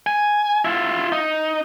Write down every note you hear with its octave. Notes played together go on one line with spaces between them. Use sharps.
G#5
E4 F4
D#4